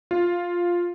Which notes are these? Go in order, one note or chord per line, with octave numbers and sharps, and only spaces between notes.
F4